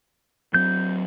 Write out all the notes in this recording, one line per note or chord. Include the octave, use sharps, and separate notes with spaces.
F#3 C4 G6